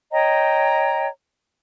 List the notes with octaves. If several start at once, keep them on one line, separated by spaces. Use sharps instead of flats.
C#5 D#5 G5 A#5